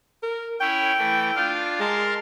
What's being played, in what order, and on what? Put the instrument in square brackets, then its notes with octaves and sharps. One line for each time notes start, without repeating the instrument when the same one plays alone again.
[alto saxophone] A#4
[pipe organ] C#4 E4 C#5 [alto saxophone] G5
[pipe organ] E3 A3
D4 F4 F5
[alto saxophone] G#3 [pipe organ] A#4 A5 C6